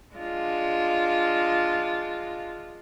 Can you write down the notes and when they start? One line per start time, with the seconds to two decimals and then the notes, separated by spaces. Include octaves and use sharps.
0.15 G#3 D4 F4